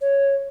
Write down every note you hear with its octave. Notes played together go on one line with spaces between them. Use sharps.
C#5